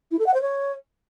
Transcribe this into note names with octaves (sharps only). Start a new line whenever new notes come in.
E4
A4
F#5
C5
C#5